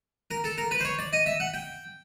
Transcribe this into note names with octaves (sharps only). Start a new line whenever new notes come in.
A#4
A4
A#4
B4
C5
C#5
D5
D#5
E5
F#5
G5